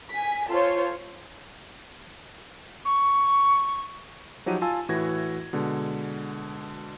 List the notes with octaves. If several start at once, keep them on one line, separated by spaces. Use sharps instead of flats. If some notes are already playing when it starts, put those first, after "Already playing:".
G#5 B6
F4 A4 C5 C#5
C#6
F3 F#3 D#4 G4 F#5 D#7
F4 G#5 A5 E6
A2 E3 F#4 G#6 A#6
B2 D3 G#3